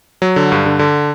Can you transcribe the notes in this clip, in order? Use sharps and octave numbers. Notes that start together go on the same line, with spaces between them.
F#3
D3
G2
D3
D3